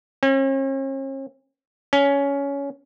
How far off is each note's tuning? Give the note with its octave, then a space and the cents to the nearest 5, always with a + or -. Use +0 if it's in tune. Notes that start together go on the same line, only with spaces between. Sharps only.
C#4 -45
C#4 +15